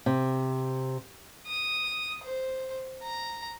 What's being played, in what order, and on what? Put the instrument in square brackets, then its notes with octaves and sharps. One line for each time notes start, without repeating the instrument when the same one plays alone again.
[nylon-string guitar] C3
[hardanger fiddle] D#6
C5
A#5